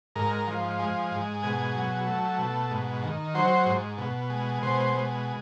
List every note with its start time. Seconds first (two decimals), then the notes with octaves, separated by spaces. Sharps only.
0.16 G#2 A#4
0.47 F3
0.79 G#3
1.11 G#2
1.43 B2 G#4
1.74 F#3
2.06 A3
2.38 B2
2.70 G#2
3.03 D#3
3.35 F#3 C5
3.66 G#2
3.98 B2
4.30 G#3
4.63 B2 C5
4.94 G#3